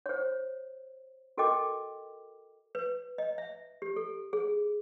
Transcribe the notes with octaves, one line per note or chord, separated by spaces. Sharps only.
C5 C#5
F#4 A4 A#4 D#5 G5 D6
B4
D#5
E5
G4
A4
G#4